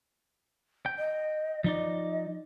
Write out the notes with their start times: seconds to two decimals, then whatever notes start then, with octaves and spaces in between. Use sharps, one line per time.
0.86 G5
0.99 D#5
1.64 F3 D#4 D5 D#5